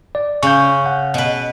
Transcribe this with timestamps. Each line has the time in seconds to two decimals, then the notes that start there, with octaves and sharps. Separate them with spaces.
0.15 D5
0.43 C#3 C#6 G6
0.86 F#5
1.14 B2 B4